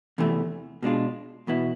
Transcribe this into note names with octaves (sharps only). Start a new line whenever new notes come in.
E2 C3 E3 A3
B2 G#3 D4 F4
E2 B2 B3 E4